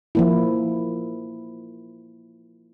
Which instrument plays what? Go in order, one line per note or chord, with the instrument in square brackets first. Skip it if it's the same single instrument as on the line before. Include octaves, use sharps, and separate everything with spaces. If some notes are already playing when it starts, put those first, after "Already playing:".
[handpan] F3 A#3 E4